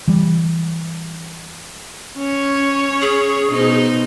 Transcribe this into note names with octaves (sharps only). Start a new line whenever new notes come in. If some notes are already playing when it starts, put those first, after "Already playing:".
E3 G3
C#4 C#5
G#4
B2 D#4 C5